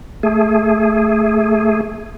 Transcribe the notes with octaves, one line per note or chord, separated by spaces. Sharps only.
A3 G#4